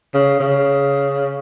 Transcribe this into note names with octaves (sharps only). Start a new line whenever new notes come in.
C#3
C#3